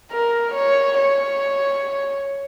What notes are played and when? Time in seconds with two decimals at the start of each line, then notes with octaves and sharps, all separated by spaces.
0.12 A#4
0.54 C#5
0.97 C#5